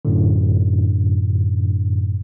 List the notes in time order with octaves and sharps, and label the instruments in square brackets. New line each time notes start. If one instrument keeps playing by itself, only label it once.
[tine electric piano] F#2 A2 D3